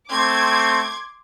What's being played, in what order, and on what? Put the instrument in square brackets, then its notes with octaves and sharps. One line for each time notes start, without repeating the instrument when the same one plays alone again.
[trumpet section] A3 C4 [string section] C6 D6 G#6